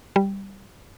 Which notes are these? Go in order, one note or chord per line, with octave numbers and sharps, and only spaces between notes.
G3